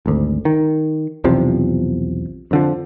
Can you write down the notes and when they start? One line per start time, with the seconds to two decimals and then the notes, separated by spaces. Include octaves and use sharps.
0.06 G#1 D2
0.45 D#3
1.24 B1 E2 C3 F3
2.51 F2 D3 F3